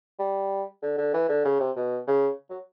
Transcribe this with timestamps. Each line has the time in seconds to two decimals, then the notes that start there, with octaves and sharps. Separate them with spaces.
0.19 G3
0.82 D3
0.98 D3
1.14 E3
1.29 D3
1.45 C#3
1.60 C3
1.76 B2
2.07 C#3
2.50 F#3